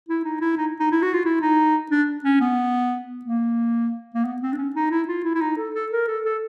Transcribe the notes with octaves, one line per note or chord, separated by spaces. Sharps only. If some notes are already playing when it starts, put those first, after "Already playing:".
E4
D#4
E4
D#4
D#4
E4
F#4
F4
E4
D#4
D4
C#4
B3
A#3
A#3
B3
C4
D4
C#4
D#4
E4
F4
E4
E4
D#4
A4
A4
A#4
A4
A4